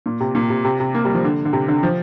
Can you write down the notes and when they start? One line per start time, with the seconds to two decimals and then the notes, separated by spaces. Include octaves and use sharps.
0.06 A#2
0.20 C3
0.35 A#2
0.50 C3
0.65 C3
0.80 C3
0.95 A#3
1.05 G3
1.15 F3
1.24 D3
1.45 D3
1.53 C3
1.68 D3
1.83 F3